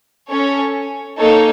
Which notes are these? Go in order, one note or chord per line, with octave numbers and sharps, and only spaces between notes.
C#4 A4 C#5
A#3 D#4 A4 C#5